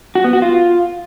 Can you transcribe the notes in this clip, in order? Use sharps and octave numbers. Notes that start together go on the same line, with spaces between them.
F#4
B3
F#4
F4